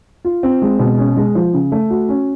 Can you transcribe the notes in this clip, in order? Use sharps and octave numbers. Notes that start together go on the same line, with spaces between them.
F4
C4
G#3
B2
C#4
G#3
F3
C#3
A3
F#4
C#4